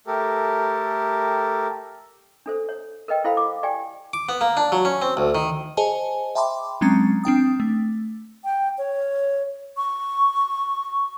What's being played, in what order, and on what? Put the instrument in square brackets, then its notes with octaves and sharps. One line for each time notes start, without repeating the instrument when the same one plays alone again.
[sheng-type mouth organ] A3 G4 A4 A#4
[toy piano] D4 A4 C5
C#5
A#4 B4 D#5 G5
E4 A4 C5 F5 B5
D6
G4 D5 G5 G#5
[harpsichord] D6
B3
A#3
D4
F#3
C#4
C4
D2
D#3
[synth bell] G#4 C5 D#5 G#5 A5
E5 G5 A5 B5 C6 D6
F#3 G#3 C4 C#4 A#5 A6
C4 D4 G5 D#6
A3
[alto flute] G5
C#5
C#6